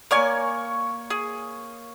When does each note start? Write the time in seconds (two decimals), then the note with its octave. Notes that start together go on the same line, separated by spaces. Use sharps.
0.11 A#3 A#4 C#5 D5 G#5 C#6
1.10 G#4